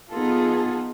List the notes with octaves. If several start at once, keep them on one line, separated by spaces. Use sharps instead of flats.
B3 D#4 F4 G#4 A4